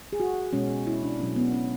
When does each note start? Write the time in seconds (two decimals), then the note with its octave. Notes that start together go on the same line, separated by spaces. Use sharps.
0.13 G#4
0.20 F#4
0.53 B2 G#3 C#4
0.87 E4
1.03 D4
1.20 B2 F#3 A3 C#4
1.36 B3
1.52 C#4